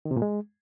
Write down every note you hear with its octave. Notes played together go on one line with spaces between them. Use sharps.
D#3
C3
A#2
G#3